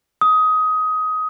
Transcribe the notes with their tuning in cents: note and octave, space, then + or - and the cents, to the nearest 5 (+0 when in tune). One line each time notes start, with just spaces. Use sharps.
D#6 +15